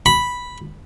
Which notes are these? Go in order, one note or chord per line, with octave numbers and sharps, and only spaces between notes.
B5